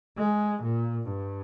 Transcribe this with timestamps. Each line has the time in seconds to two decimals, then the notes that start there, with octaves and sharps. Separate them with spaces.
0.18 G#3
0.63 A#2
1.08 G2